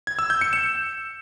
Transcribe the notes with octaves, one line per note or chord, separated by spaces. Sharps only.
G#6
E6
G6
C#7
E7